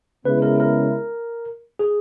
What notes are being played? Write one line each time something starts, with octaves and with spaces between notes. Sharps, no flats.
C#3 G#3 B3 E4 B4
A#4
A#4
G#4